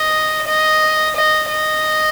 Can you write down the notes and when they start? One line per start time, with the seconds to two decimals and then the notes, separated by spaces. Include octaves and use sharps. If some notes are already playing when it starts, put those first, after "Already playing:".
Already playing: D#5
0.47 D#5
1.15 D#5
1.49 D#5